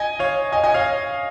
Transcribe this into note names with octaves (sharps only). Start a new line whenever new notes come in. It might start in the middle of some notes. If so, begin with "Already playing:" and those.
Already playing: D#5 G#5
C#5 F5
D#5 G#5
D#5 G#5
C#5 F5